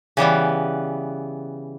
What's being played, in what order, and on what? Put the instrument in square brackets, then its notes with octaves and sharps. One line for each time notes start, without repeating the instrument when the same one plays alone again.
[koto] C#3 E3 G3 B3